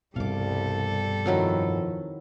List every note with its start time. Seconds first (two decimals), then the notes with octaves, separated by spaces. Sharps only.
0.16 C2 G2 B2 G3 A4 F5 D6
1.26 F2 D#3 F#3 E4